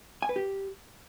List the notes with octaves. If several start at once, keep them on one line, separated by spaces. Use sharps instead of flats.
G#5
B4
G4